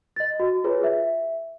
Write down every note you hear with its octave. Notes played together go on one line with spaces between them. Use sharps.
D#5 A6
F#4
F4 G#4 B4 C#5
E5